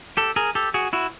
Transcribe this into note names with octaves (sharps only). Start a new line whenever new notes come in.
G4 A4
G#4 A#4
G4 A4
F#4 G#4
E4 F#4